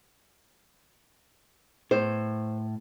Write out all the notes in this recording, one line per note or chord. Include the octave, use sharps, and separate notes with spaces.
A2 C5